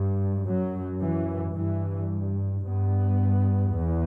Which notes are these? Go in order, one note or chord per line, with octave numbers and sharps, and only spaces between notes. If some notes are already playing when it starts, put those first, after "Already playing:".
Already playing: G2
F#2 F#3
E3
G2 E3
G2 B3
E2